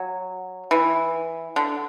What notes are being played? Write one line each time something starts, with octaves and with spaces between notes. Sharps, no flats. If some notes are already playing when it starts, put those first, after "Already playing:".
Already playing: F#3
E3
D3